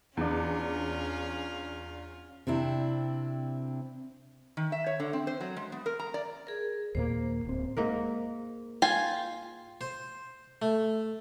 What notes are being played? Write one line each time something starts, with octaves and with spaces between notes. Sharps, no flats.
E2 C#4 D4 F4
C3 C4 D4 E4
D#3
E5
C#5
D3
C4
C5
F#3
G#3
B3
A#4
A#5
D5
G#4 A#4
D#2 A#2 A#3 C5
D1 C4
G#2 A#3 A#4
F4 G5 G#5
C5
A3